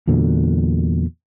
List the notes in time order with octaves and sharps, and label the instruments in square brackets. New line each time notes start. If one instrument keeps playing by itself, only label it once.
[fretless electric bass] E2 A#2 D3 F#3